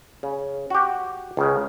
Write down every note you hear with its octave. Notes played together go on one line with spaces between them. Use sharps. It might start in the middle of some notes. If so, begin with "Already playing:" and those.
C#3
F#4 G4
C#2 C#3